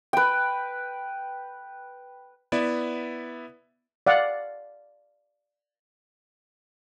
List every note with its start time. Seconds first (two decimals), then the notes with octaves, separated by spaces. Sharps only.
0.13 B4 G5
2.52 B3 E4 D5 E5
4.07 D5 F5 F#5